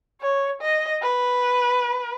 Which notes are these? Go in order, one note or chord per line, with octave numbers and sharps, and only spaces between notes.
C#5
D#5
B4